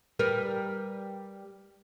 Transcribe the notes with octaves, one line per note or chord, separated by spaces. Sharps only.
G3 A#4 B4